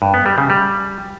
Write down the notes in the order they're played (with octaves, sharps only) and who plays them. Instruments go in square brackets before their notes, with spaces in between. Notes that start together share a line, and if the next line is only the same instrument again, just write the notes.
[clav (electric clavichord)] G2
B3
G3
C#3
G3